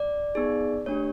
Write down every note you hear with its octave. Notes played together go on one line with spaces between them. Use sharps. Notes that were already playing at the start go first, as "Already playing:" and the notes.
Already playing: D5
B3 D#4 G#4
A3 D4 G4 C#5